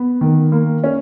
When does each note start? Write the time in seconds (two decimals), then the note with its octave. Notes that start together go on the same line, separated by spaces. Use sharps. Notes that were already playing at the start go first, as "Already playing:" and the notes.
Already playing: B3
0.21 D#3
0.52 A#3
0.84 C#4